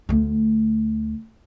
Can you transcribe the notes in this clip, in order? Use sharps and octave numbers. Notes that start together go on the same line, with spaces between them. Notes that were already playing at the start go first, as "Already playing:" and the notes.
D2 A3